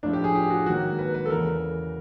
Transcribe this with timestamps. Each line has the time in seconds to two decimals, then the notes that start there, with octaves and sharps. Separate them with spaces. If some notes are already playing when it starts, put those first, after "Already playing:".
0.03 A2 F3 A3 D4
0.13 G4
0.24 G#4
0.35 G4
0.50 F#4
0.66 G#2 D#3 F#3 A#3 F#4
0.99 B4
1.14 B4
1.26 A4
1.30 E2 C#3 E3 A#4